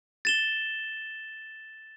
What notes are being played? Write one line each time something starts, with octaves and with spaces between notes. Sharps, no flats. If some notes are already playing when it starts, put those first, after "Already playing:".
A6 E7 G7